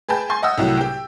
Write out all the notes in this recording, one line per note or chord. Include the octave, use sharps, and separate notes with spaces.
G#4 B4 G5 A5 G6
G#5 C6 A6
D#5 F#5 D#6 E6
C2 A2 F#3
G4 G5